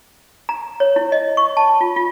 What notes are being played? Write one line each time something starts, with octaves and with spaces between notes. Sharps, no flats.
A#5
C#5
E4
D#5
C#6
A5
F4
F4